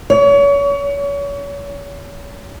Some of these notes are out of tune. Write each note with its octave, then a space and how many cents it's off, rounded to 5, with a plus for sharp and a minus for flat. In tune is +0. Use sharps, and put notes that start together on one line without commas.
C#5 +35